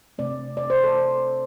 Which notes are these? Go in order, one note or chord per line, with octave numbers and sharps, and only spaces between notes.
C3 A3 C4 D5
D5
C5
A4